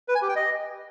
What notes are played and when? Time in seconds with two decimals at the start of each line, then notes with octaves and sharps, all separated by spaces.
0.08 B4
0.15 G#5
0.22 G4
0.29 G5
0.36 D#5